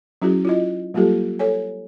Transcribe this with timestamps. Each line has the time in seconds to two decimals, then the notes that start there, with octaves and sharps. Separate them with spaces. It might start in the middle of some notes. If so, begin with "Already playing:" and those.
0.22 F#3 C#4 E4 F#4 G#4
0.45 E4 F4 D#5
0.94 F#3 G3 A#3 F4 G4 A4
1.39 A4 C#5 G#5